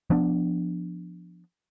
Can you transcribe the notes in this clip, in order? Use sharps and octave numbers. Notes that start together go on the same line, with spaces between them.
F3 B3 D4